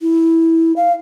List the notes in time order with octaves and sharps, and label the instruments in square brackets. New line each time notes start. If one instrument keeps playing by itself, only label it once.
[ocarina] E4
F5